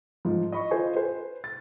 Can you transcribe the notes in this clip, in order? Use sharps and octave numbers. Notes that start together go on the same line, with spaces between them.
G#2 F3
D#5 B5 C#6
F4 A4 C5 D#5 G#5
B4 C5
A6